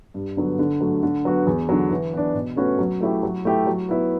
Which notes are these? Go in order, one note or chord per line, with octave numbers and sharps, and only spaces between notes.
G2
D3 F#3 B3
D3
F#3 A3
D3
F#3 B3 F#4
E2
D3 F#3
E3
B3 D4
B2
A3 C#4 F#4 B4
F#3
A3 E4 G4
F#3
A3 E4 G4
F#3
B3 E4